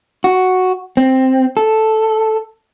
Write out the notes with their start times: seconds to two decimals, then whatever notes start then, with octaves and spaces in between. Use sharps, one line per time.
0.24 F#4
0.97 C4
1.57 A4